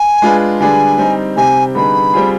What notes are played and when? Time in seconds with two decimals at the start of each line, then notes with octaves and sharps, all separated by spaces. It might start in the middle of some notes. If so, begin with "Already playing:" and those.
Already playing: G#5
0.22 G#3 D4 F4 G#4 B4
0.60 D3 G3 D4 G#4 B4 G#5
0.98 G3 C4 D#4
1.37 C3 G3 C4 G4 G#5
1.75 D3 G3 B3 D#4 G#4 B5
2.14 G3 C4 F4 G#4